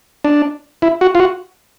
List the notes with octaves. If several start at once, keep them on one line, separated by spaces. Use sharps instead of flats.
D4
E4
F#4
F4
F#4